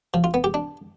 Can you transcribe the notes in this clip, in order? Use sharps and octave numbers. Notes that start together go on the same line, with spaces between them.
F3
F4
B3
G4
D4